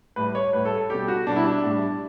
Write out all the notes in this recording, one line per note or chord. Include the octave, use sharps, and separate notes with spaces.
A2 G3 B4
C#5
A2 G3 B4
A4
A4
B2 G3 G4
F#4
B2 G3 D4
E4
D4
A2 G3